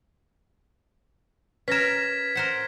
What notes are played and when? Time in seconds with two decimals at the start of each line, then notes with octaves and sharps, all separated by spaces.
1.68 C#4 A#4 B4 G#6 A#6 B6 E7
2.35 A#4 C5 F#5